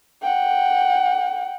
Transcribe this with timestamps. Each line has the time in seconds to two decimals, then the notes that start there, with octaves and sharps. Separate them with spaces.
0.23 F#5 G5